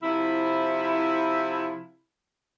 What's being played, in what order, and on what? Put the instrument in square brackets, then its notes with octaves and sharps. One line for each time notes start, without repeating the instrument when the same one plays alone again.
[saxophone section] C3 F3 E4